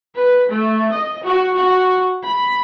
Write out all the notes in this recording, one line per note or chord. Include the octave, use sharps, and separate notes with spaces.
B4
A3
D#5
F#4
F#4
B5